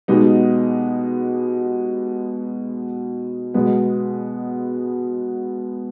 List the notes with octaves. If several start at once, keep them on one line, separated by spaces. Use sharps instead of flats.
B2 G#3 B3 D#4 G4
B2 G#3 B3